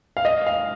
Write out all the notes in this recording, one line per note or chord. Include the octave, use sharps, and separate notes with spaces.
F5
D#5
F5